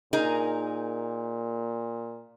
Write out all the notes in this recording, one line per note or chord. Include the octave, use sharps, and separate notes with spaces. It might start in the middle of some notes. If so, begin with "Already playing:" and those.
A#2 D#4 G#4 A#4